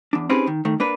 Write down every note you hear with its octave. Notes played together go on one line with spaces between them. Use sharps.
E2 D4
C4 C#4 D#4 G4 G#4 B4
D#3
D#3 A3
A#3 D4 B4